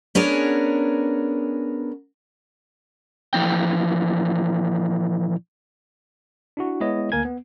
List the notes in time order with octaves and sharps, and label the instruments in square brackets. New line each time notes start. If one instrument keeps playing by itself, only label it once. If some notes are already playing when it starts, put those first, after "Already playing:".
[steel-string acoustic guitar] B3 C#4 D4 G#4 A#4
[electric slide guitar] A#2 E3 F3 C4 G5
[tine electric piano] D4 E4 F#4
G#3 B3 E4 G#4 C#5 D#5
D2 A#3 A#4 G#5 G#6
B3